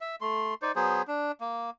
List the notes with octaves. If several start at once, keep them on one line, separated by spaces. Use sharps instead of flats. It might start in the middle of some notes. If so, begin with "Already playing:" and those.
E5
A3 C6
D#4 C5 D5
F#3 B3 G#4 C5
D4
A#3